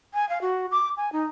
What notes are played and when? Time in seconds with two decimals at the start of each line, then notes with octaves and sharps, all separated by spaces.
0.14 G#5
0.29 F5
0.41 F#4
0.71 D6
0.97 G#5
1.13 D#4